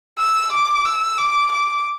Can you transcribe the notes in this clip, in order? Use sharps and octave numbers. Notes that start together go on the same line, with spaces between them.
E6
D6
E6
D6
D6